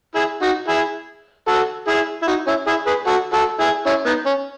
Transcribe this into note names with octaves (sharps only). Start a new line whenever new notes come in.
E4 G#4
D#4 F#4
E4 G#4
F#4 A4
E4 G#4
E4
D#4 F#4
C#4 E4
E4 G#4
G#4 B4
F#4 A4
F#4 A4
E4 G#4
C#4 E4
B3 D#4
C#4